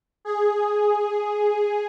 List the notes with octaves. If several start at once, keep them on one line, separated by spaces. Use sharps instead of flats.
G#4